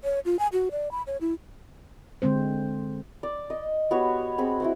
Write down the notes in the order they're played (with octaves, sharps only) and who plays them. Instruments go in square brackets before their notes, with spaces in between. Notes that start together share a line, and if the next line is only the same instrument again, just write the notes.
[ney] C#5
F4
G#5
F#4
D5
B5
C#5
E4
[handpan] D3 G#3 C4 C5
[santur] D5
D#5
B3 F#4 G4 C#5
C4 G#4 B5
E4 F#4 C5